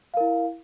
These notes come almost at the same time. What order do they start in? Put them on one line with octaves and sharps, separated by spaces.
F5 A#4 E4